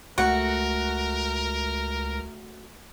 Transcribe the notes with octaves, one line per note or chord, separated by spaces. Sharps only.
C#2 A3 F#4 A#4